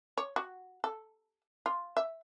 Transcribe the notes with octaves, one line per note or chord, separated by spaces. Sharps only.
C#5
F#4
A4
F4
E5